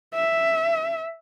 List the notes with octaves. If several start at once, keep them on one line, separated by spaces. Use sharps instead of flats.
E5